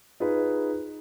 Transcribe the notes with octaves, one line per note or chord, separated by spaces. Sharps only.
D#4 F4 G#4 B4